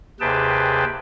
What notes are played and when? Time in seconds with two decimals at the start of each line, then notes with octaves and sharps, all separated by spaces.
0.20 D#2 C3 G#4 B4 G5 A5